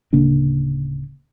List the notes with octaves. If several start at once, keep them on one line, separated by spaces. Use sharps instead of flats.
D1 C#3 A#3 D4